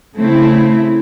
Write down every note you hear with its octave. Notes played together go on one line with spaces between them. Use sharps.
C#3 A3 C4 E4